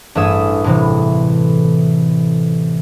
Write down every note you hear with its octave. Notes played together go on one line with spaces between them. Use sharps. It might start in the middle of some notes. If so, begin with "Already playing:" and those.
A1 G2 G#4 E5 D#6 E7
A2 C3 E3